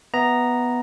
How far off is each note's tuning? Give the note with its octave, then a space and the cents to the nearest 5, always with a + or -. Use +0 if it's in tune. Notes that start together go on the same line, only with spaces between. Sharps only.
B3 +0 E5 +0 A#5 +0